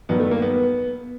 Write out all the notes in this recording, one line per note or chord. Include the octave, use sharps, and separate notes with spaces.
G2 D#3 F#3 B3
A3
A#3
B3